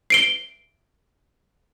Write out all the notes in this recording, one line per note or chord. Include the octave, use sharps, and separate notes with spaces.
C7 D7 G7